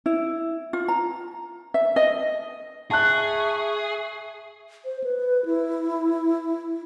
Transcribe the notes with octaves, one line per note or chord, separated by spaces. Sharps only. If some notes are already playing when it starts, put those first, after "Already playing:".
E4
F4
A#5
E5
D#5
G#4 E5 A5 C#6 F#6
C5
B4
E4